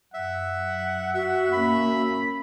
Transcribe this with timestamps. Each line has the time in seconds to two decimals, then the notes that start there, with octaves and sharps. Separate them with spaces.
0.14 F#2 E5 F#5
1.14 F#4 E5
1.52 A#3 C#4 B5